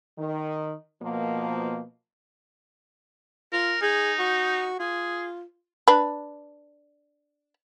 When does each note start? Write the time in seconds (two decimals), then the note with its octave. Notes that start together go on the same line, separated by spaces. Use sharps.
0.19 D#3
1.02 B2 F3 A#3
3.53 F4 A#4
3.82 D#4 G#4
4.19 F#4
4.80 F4 G#4
5.88 D4 B4